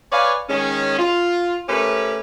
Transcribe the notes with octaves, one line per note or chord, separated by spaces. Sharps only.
B4 C#5 D5 F5 G#5
D#3 G#3 C#4
F4
A3 C#4 G4 A#4 B4